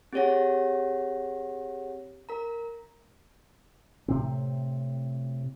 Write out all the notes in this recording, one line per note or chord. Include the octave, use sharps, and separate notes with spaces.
C4 G4 G#4 C#5 F#5 A#6
A#4 A#5
A2 C3 C4